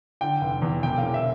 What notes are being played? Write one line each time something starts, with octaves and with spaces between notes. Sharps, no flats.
D3 G5
F1
E2
E1 G5
F5
E1
E5